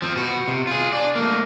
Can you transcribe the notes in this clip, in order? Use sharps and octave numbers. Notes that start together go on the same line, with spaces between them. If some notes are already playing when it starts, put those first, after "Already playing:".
F3 C4
B2 F#4
C3
F4 G#4
D4 D5
A3 A#3